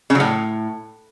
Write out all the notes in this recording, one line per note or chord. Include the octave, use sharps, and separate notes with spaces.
C#3
F#3
A2